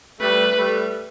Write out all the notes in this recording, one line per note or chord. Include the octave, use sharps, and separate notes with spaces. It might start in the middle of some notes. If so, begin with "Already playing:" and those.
G3 A3 B4
G3 A3